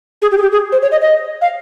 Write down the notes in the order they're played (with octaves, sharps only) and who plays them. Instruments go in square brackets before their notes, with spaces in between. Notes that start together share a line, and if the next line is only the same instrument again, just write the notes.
[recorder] G#4
G4
G#4
G4
G#4
C5
C#5
D#5
D#5
F5